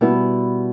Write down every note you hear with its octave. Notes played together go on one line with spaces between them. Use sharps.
B2 G3 B3 E4